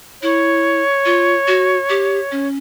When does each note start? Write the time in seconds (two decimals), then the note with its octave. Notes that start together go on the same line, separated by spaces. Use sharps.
0.22 E4 C#5
1.05 F4
1.47 F#4
1.89 G4
2.32 C#4